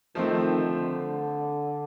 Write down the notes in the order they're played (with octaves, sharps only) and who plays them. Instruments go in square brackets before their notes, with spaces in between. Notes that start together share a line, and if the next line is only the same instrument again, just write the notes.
[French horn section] D#3 [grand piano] F3 A3 C4
[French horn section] D3